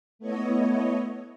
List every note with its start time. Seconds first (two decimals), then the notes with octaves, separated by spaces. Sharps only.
0.19 A3 B3 E4 C#5 D#5